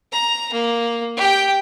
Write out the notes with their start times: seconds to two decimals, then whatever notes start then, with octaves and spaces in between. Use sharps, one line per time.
0.12 A#5
0.53 A#3
1.17 G4 G5